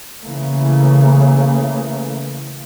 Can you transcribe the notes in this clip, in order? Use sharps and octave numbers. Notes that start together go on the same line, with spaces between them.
C#3 E3 A3 A#3